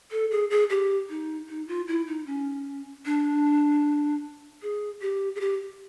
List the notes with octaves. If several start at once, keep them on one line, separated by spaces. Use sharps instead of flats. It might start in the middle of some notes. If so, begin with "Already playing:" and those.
A4
G#4
G#4
G4
D#4
D#4
F4
E4
D#4
C#4
D4
G#4
G4
G#4
G4